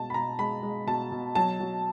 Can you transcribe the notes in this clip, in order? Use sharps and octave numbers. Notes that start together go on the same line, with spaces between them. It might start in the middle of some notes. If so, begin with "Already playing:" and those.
Already playing: B2 G#3 A5
B5
B2 A#5
G#3 B5
G#3
B2 A5
B2
F#3 A5
F#3